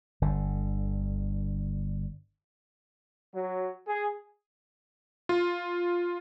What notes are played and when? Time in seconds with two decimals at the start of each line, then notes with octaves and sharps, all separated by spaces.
0.22 G1 D3
3.33 F#3
3.87 G#4
5.29 F4